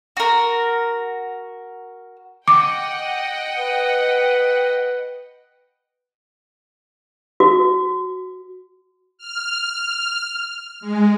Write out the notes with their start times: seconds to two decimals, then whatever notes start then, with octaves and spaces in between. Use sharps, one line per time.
0.17 F#4 A#4
2.48 D#5 F#5 G5 D6
3.57 B4
7.40 F#4
9.18 F6
10.81 G#3